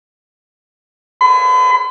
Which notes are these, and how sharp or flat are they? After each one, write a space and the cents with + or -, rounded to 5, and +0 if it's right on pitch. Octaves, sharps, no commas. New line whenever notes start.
B5 +45